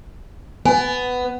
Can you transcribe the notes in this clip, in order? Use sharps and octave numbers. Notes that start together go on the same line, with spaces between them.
B3 G#5